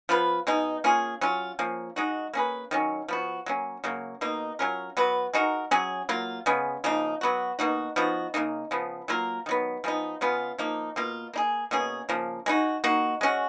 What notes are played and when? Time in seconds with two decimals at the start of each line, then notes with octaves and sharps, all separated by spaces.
0.09 F3 B3 F4 B4
0.47 B2 G#3 D#4
0.84 A#3 C#4 F4 G#4
1.21 F#3 C#4 F4
1.59 F3 A#3 C#4
1.96 G#3 D#4 F#4
2.33 A#3 C#4 G#4 B4
2.71 D#3 F#3 C#4
3.08 F3 B3 F#4
3.46 F#3 A#3 C#4
3.84 C#3 F#3 A#3
4.21 B2 A#3 D#4
4.59 F#3 C#4 F4 A#4
4.97 F#3 B3 F#4 B4
5.33 G#3 D#4 F#4 A#4
5.71 F#3 C#4 G#4
6.09 F#3 A#3 F4
6.46 C#3 G#3 B3
6.84 C#3 F3 A#3 D#4
7.21 F#3 B3 F#4
7.59 B2 A#3 D#4 F#4
7.96 F3 B3 D#4 F#4
8.34 C#3 F#3 A#3 D#4
8.71 C#3 F3 B3
9.08 F#3 A#3 F4 A#4
9.46 D#3 F#3 B3
9.84 F3 G#3 B3 D#4
10.21 C#3 G#3 B3 F4
10.58 F3 A#3 D#4
10.96 B2 A#3 F4
11.34 A#3 D#4 G#4
11.71 B2 A#3 C#4 G#4
12.09 C#3 F3 A#3
12.46 G#3 B3 D#4 F#4
12.84 A#3 D#4 F#4
13.21 G#3 C#4 F#4